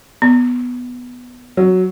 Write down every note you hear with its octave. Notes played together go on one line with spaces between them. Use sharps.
B3
F#3